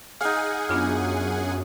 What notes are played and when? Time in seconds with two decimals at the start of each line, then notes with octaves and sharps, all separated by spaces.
0.21 D#4 G#4 F5 F#5 G#5
0.69 F#2 B3 D4 F4